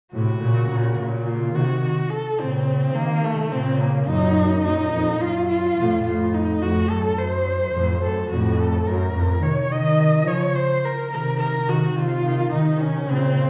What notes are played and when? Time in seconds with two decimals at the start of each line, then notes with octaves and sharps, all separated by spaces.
0.14 A2 C3 F#4
0.42 A#2 C#3
0.70 A#2 C#3
0.99 A#2 C#3
1.27 F4
1.54 C3 D#3 F#4
2.10 A4
2.39 A#2 C#3 C4
2.95 C3 D#3 A#3
3.24 A3
3.51 A#2 C#3 C4
3.81 A#3
4.08 F#2 A#2 D#4
4.64 F#2 A#2 D#4
4.92 F2
5.21 F#2 F4
5.48 F4
5.77 F2 A2
6.05 F2 A2 F4
6.34 D#4
6.61 F2 A2 F#4
6.89 F#2 A4
7.18 F#2 C5
7.74 F2 A2
8.02 F#2 A4
8.30 F2 A2 F#4
8.59 A4
8.86 F#2 A#4
9.14 F2 A2
9.43 C3 D#3 C#5
9.71 C3 D#3 D#5
10.27 C#3 F3 C#5
10.55 C5
10.85 A#4
11.12 C3 D#3 A#4
11.40 A#4
11.68 C3 D#3 F#4
11.96 C3 D#3 F4
12.25 C3 D#3
12.53 C3 D#3 D#4
12.81 C#4
13.09 A#2 C#3 C4